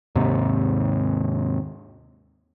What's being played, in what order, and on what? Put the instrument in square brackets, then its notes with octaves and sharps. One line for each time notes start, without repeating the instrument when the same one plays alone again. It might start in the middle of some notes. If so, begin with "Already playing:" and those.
[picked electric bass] D#2 G#2 C3